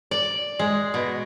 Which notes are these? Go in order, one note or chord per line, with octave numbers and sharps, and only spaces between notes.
D5
G#3
B2